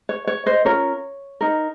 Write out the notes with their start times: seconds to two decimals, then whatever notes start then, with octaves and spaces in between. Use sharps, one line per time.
0.09 C#5
0.27 C#5
0.46 C5 D#5
0.65 C#4 F4 A#4 C#5
1.41 D#4 A#4